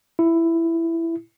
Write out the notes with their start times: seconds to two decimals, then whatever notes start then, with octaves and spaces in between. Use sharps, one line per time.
0.19 E4